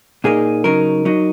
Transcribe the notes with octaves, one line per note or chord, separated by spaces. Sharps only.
A#2 A#3 D#4 G#4
C#3 F#3 D#4 A#4
F#3 D#4